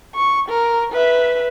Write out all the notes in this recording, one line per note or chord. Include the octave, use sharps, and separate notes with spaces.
C#6
A#4
B4 E5